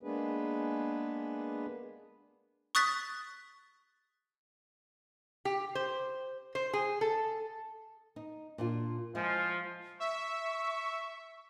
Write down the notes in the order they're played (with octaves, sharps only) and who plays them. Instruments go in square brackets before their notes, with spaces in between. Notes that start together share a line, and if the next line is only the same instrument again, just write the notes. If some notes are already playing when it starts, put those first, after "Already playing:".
[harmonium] G#3 A#3 B3 D4 G#4 B4
[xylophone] C#6 D#6 F#6 A6 B6
[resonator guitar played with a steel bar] G4
C5
C5
G#4
A4
[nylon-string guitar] D#4
A#2 D4 F4
[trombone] F3 [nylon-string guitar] G#3 E4 G#4
[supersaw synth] E5 [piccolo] C#6